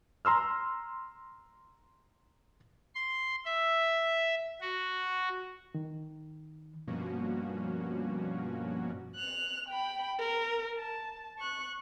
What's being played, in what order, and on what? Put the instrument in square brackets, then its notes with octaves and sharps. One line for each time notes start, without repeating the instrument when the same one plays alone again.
[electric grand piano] A#5 C6 E6 F6
[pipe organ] C6
E5
F#4
[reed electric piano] D#3
[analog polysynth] G2 B2 F3 A#3 C#4 F#4
[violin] F#6 F7
G5 B5
A#4
A5
C#6 F#6